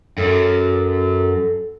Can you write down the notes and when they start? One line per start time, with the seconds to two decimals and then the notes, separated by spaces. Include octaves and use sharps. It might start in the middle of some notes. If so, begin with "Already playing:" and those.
0.18 F#2 A4